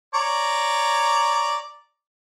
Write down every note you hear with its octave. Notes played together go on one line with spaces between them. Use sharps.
C#5 D5 A#5